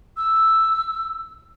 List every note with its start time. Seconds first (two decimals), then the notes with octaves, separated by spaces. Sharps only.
0.17 E6